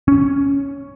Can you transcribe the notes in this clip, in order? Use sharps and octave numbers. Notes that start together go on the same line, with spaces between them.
C#4